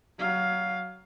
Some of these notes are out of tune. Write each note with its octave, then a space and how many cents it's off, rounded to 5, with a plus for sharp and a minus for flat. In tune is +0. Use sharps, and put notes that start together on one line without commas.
F#3 +20 F5 +10